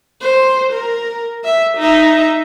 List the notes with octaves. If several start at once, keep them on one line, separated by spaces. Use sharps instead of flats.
C5
A#4
E5
D#4 E5